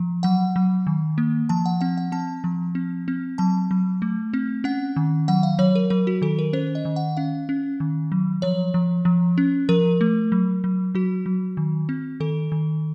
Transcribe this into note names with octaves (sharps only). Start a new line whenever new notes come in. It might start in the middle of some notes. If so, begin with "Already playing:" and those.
Already playing: F3
F#3 F#5
F#3
D#3
A#3
F3 A5
F#5
C4 F#5
F#5
C4 A5
F3
C4
C4
F#3 A5
F#3
A3
C4
C#4 F#5
D#3
F#3 F#5
F5
F#3 C#5
A#4
F#3 A#4
F#4
D#3 A4
A#4
C#4 C5
D#5
D#3
F#5
C#4 F5
C#4
D#3
F#3
F3 C#5
F3
F3
C#4
F3 A#4
A3
F#3
F#3
F#3 F#4
F#3
D#3
C4
D#3 A4
D#3